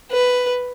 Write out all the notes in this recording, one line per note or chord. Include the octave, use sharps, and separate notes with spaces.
B4